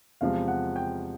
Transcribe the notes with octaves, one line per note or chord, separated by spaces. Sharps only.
E2 C3 F3 G#3 F5
F#5
G5